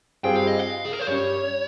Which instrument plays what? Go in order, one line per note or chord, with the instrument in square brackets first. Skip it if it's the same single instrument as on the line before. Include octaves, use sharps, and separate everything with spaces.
[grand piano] G2 G3 C4 F4 G#4 [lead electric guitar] G5
[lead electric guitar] F5
D#5
F5
G#4
A#4
C5
[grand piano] G2 G3 C#4 [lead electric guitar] C#5